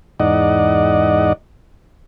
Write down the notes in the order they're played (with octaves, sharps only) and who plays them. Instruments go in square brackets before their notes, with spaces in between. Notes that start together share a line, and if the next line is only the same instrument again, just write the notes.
[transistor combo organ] E2 G#2 D#4 D5 D#5 F#5